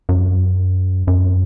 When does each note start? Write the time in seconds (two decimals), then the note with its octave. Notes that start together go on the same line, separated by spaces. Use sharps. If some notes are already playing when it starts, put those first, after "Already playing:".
0.09 F#2
1.07 F#2